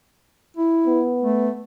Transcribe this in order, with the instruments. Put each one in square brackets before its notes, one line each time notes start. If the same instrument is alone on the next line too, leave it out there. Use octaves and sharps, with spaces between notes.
[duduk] E4
[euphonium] B3
[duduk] A3